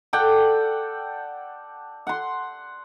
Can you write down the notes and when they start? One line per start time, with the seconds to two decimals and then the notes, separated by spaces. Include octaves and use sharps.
0.13 A4 D5 F#5 G5
2.07 F#5 C6